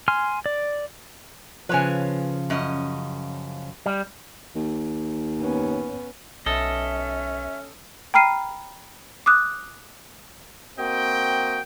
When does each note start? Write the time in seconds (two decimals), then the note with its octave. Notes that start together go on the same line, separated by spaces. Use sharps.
0.08 G#5 C6 F6
0.46 D5
1.69 C#3 F3 B4 C#5 G#5
2.50 F#2 C#4 D#5
3.86 G3
4.55 D#2
5.40 B3 C#4
6.46 B1 C#4 A4 D#5 E5
8.14 G5 A#5 B5 F6 C7 D#7
9.26 D6 D#6 F#6
10.79 A#3 C4 F#4 D#5 G5